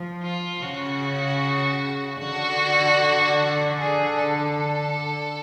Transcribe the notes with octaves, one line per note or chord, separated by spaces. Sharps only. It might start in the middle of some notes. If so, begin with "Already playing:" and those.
Already playing: F3
F4
C#3 F#4
D3 F#4
G#4
A4